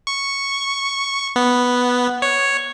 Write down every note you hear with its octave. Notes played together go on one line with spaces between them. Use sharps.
C#6
B3
C#5